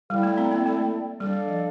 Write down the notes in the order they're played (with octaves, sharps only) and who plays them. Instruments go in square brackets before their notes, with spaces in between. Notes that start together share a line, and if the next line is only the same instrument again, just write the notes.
[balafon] G3 [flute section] E4 A4 D5 G5
[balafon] A3
C4
A#3
A3
[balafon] G3 [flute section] D4 A4 D5 F5
[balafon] F3